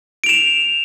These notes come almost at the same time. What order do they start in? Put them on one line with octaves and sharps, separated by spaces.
D7 F7 E7